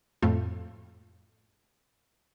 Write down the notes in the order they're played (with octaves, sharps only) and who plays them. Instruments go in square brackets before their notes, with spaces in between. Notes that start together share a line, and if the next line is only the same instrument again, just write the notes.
[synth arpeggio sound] F2 A2 A3 F4